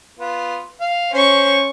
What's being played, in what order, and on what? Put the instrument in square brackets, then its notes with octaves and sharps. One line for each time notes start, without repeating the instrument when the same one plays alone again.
[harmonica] B3 F4
F5
[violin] C#4 C#6 [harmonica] C5